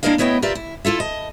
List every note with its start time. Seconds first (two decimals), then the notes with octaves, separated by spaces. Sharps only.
0.03 A#3 D4 E4 A#4 D#5 F5
0.18 A3 B3 E4 C#5 D#5 G5
0.42 F4 G4 A#4 B4 D5 E5
0.55 E4
0.85 E4 F4 A4 E5
1.00 D#5 A5